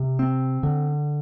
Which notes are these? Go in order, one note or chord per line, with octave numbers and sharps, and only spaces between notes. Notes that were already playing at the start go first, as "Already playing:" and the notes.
Already playing: C3
C4
D3